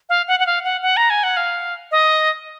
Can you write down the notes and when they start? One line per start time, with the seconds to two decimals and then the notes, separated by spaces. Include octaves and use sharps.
0.09 F5
0.28 F#5
0.40 F#5
0.46 F5
0.64 F#5
0.82 F#5
0.97 A#5
1.10 G#5
1.23 F#5
1.37 F5
1.91 D#5